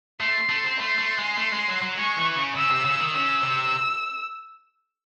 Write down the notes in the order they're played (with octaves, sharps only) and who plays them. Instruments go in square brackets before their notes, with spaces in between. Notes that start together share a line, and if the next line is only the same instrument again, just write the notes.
[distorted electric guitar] A3 [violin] C6
[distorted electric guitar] A3
C4
[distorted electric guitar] A3 [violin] C6
[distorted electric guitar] A3
G#3
A3
G#3
F#3
F#3
[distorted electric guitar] G#3 [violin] C#6
[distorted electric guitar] E3
C#3
[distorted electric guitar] C#3 [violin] E6
[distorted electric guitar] C3
C#3
D#3
[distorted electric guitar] C#3 [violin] E6
[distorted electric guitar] C3